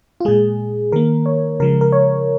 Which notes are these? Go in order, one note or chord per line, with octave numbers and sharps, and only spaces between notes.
F4
A#2 G#3 G#4
D#3 A#3 A#4
C#5
C#3 F3 G#3 A#4
A#4
C#5